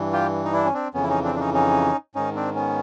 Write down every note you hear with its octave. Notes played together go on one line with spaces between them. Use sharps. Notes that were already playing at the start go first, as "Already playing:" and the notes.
Already playing: G2 E3
F4 G4
D#4
D4 E4
C#4
C4 D4
F2 C#3 E3 B3 C#4
E4
C#4 D#4
C4 D4
D4
C#4 D#4
C#4 D#4
G#2 D#3 C#4 D#4
C4 D4
B3 C#4